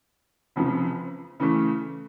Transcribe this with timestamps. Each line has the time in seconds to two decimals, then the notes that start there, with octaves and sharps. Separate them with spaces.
0.56 F1 F2 C#3 F3
1.40 C#3 E3 A3